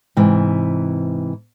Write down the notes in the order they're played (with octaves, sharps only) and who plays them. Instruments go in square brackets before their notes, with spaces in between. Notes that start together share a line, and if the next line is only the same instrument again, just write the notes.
[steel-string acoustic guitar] G#2 C3 E3